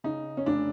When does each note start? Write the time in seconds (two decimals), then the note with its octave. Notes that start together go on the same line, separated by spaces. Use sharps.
0.04 C#3 D#4
0.37 C#4
0.46 F1 D4